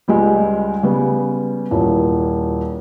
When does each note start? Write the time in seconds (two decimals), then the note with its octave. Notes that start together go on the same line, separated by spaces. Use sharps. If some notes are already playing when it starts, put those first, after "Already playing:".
0.08 C#2 G3 G#3
0.83 C#3 G3 B3
1.71 D#1 A#2 E3